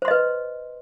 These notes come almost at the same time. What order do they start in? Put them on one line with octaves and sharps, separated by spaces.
C5 C6 D#5 B4